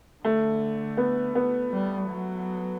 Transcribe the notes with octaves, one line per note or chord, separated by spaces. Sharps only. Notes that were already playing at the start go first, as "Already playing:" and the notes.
D3 A3
B3
B3
G3
F#3